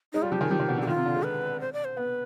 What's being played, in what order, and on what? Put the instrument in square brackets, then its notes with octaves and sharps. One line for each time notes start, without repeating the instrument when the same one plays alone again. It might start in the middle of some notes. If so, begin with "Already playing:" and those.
[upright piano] G#3 [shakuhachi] D#4
[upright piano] G3 [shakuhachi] F4
[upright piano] F3 [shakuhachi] G4
[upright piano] D#3 [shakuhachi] G#4
[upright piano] F3 [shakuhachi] G4
[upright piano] D#3
B2
D3
[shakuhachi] G4
[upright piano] D#3 [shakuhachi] F4
[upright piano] C3
D3
G#3
[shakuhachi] B4
C5
D5
C5
[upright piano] B3 [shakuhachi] B4